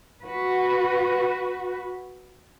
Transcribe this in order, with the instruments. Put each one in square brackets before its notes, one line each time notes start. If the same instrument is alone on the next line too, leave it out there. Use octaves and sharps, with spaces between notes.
[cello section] F#4 B4